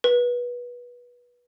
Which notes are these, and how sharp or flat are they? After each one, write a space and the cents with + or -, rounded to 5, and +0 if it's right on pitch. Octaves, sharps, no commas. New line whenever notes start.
B4 -25